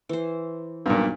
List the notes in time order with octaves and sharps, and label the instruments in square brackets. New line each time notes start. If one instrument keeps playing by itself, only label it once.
[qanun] E3 C5
[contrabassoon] B1 [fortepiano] G2 A#2